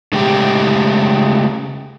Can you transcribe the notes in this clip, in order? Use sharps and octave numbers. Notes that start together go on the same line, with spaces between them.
C#3 G#3 A3 G4 G5